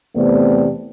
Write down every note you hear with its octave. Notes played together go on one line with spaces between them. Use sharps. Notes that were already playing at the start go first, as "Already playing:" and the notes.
E2 C3 A3 B3 C4 D5